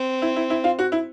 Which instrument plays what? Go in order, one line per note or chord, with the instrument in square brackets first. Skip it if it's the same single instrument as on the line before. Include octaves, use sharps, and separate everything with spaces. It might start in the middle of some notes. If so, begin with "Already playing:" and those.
Already playing: [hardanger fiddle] C4
[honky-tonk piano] E4
E4
E4
F4
F#4
E4